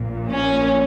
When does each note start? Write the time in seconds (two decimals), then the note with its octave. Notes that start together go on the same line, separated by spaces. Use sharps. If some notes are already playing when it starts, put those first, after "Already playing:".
Already playing: A#1 A#2
0.32 C#4